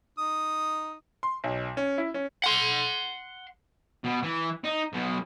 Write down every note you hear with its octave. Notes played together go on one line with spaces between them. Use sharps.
D#4 D#6
C6
B1
C#4
E4
C#4
F#5 C6
B2
E3
D#4
B1 B2